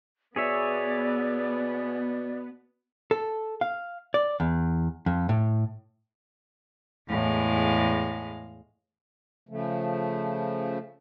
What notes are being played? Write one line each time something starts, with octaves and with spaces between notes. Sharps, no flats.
B2 B3 G#4 C#5 D5 E5
A4
F5
D5
E2
F2
A2
E2 A2 G#3 F5
C#3 F3 A3